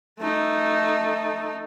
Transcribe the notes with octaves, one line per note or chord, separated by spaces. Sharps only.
A3 D#4